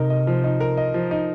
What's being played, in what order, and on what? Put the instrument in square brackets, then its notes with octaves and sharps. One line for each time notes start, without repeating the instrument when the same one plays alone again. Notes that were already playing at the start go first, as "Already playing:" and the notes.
Already playing: [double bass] C3 [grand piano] D#4 A#4
[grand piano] D#5
F3
D#4
A#4
D#5
F3
D#4